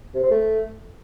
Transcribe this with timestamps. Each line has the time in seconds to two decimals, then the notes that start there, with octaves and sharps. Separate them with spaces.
0.15 C3
0.23 C4
0.31 A3